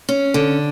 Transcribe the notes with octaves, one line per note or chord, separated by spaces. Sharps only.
C#4
D3